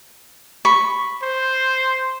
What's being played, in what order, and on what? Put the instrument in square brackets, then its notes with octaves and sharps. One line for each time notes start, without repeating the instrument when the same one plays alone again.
[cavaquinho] B5 C#6
[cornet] C5